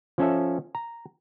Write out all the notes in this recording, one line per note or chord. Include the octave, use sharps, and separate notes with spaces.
F3 C#4 A4 E5
A#5